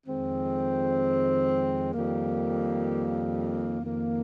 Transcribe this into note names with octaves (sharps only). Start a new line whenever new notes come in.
F2 D#3 G#3 C4
F2 D#3 G3 A#3
F2 D#3 A#3